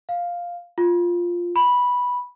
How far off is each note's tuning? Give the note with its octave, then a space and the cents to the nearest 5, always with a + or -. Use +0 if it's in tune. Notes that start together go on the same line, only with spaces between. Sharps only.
F5 +5
F4 +0
B5 -10